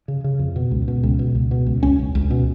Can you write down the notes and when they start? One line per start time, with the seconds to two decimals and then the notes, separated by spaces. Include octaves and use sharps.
0.08 C#3
0.24 C#3
0.39 F2
0.56 B2
0.71 C#2
0.88 B2
1.03 C#2
1.19 B2
1.35 C#2
1.51 B2
1.66 C#2
1.83 C#2 C#4
1.99 C#2
2.15 C#2
2.30 B2